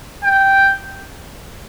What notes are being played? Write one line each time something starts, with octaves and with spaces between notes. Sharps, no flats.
G5